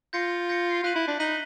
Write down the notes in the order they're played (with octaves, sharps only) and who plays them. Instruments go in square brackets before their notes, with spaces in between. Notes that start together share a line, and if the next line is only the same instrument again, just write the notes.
[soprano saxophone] F4 [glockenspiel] G6 A#6 C#7
[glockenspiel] G6 A#6 C#7
[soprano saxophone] F4 [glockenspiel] F#6 B6 D#7 F#7
[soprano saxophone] E4
D4
[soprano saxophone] D#4 [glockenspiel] F#6 B6 D#7 F#7